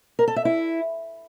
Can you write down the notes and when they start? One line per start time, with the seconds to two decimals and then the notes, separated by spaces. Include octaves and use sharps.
0.19 A#4
0.28 A4
0.36 E5
0.45 E4